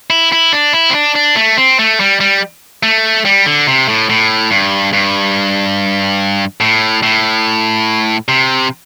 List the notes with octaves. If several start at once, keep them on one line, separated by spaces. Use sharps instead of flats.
E4
E4
D4
E4
C4
D4
D4
A3
C4
A3
G3
G3
A3
G3
D3
C3
A2
A2
G2
G2
A2
A2
C3